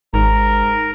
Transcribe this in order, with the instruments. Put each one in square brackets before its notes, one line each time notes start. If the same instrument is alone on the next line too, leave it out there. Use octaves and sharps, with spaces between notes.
[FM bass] G#1 [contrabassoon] G#2 [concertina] A#4 A#5